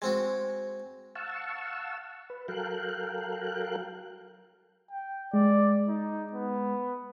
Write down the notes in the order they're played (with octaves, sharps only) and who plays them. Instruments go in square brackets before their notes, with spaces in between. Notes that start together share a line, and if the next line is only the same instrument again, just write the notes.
[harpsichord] G#3 C4 F#4
[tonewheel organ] F5 F#5 A5 C#6 E6
B4
F#3 A4 A#4 F5 G5 F#6
[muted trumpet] G5
[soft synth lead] G#3 [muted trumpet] D5
[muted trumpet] D#4
B3